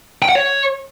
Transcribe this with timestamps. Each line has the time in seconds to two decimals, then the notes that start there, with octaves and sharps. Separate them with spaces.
0.22 G5
0.29 F#5
0.35 C#5